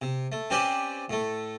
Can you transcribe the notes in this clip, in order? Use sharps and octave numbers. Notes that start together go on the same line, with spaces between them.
C3
A3
C4 C#4 G4 B4 C5 D5
A2 A3